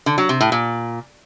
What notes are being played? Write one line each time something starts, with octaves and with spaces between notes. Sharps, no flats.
D3
F#3
C3
A2
A#2